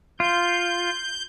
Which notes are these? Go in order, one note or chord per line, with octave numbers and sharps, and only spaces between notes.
F4 G6